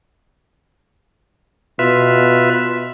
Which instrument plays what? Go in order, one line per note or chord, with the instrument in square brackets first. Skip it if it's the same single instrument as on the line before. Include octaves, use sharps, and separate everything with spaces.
[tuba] B2 [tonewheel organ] F4 B4 E5